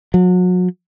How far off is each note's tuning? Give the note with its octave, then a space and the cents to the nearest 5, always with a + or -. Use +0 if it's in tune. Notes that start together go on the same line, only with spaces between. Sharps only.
F#3 -35